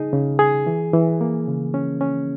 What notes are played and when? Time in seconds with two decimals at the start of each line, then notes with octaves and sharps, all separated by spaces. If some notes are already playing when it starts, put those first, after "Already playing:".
Already playing: C#3 D#4 G#4
0.13 C#3
0.39 G#4
0.67 E3
0.93 E3
1.21 A#3
1.47 C#3
1.74 C#4
2.01 C#4